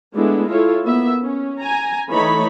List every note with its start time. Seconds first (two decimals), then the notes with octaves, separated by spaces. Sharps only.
0.15 G#3 A3 B3 D4 E4
0.49 E4 F4 A4 C#5
0.84 A#3 B3 E5
1.21 C#4
1.59 G#5 A#5
2.11 E3 A3 D#4 A4 C#5 B5